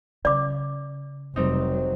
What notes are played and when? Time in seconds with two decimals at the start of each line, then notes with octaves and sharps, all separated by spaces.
0.25 C#3 D5 D6
1.36 F1 F#3 G3 C4 D#4